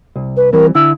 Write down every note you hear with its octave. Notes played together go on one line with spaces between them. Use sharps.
C2
B4
E3 G3 C4 A#4
D3 E4 E6